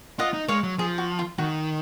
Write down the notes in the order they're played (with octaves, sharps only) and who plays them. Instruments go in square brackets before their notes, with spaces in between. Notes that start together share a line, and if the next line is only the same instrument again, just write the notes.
[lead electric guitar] F4 [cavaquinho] D#5 F#5
[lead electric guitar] D#4
[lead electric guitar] G#3 [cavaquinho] C#5 F5
[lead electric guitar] F#3
[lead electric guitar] F3 [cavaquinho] G#4
[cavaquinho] F#4
F4
[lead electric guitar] D#3 [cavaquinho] F#4